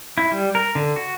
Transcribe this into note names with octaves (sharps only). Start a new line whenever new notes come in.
E4
G3
A#4
D3
F#4